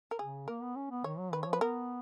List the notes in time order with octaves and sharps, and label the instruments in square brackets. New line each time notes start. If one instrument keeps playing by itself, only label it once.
[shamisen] A#4
[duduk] C#3 [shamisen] G#4
[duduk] A#3 [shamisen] A#4
[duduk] B3
C#4
B3
[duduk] D#3 [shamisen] C#5
[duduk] F#3
[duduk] D#3 [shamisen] B4
[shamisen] C#5
[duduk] F3
[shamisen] B4
[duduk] B3 [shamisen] A#4